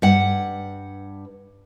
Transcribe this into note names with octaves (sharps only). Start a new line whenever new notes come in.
G2 F#5